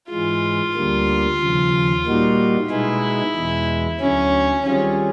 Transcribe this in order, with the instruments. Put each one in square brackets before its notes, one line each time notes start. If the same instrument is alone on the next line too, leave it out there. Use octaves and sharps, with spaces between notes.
[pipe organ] G#2 E3 G#3 [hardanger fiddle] F4
[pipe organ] D2 D3 G3 A#3
D#2 C#3 F3
A#2 G3 A#3 D#4 F#4
[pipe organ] B2 G#3 B3 D#4 G#4 [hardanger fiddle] E4
[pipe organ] E2 B2 G#3
[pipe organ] D2 D3 F#3 [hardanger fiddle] C#4
[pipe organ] D#3 G3 C4 F4 G#4 [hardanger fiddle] C#4